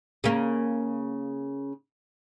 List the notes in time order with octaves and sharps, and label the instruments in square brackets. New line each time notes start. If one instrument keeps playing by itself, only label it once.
[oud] C#3 A#3